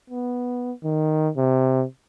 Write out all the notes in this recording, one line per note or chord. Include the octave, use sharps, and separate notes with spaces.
B3
D#3
C3